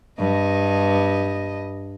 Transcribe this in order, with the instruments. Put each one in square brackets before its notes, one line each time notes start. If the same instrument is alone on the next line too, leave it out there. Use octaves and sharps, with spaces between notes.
[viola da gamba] G2 D#5